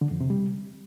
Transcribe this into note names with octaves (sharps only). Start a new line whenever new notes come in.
D3
F2
C3
G3